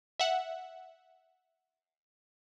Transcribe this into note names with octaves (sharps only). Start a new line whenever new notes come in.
E5 F#5